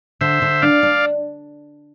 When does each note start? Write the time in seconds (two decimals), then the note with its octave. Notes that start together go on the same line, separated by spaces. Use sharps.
0.21 D3 C5 E5
0.42 D3
0.62 D4 D5 F5
0.83 D4